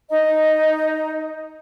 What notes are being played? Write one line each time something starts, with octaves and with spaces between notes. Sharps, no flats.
D#4 D#5 A#5